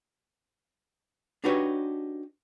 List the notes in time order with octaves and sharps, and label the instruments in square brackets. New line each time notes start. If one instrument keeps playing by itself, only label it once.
[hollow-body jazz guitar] D4 D#4 F#4 G4 B4 C#5